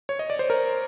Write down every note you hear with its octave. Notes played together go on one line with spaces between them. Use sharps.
C#5
D#5
D5
C5
A#4